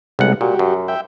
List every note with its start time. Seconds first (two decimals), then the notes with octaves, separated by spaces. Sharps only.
0.19 B1 C3 G3 G#3 F#5
0.41 A#2 F#4 G4
0.59 F#2
0.88 E5 G5